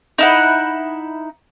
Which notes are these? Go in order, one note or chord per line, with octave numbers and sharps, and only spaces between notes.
D#4 E4 F#5